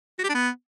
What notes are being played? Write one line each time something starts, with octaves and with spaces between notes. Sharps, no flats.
F#4
G4
D4
B3